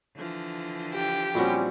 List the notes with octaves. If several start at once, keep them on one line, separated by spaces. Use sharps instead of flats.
D3 E3 F3
G4
A#1 G3 C4 C#4 E4 F#4